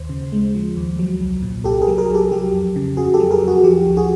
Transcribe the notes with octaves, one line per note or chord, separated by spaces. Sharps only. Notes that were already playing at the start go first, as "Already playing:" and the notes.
Already playing: D#2 C5
C#3
G#3
F3
D#2
F#3
C2
A#2
C2 G4 A4
G#4 A#4
F#3
G#4 A#4
C2
G4 A4
F#3 G4
F2
C#3
F2 F#4 G#4
G4 A4
F#3
G#4 A#4
F2
F#4 G#4
F3 G4
D2
F#4 G#4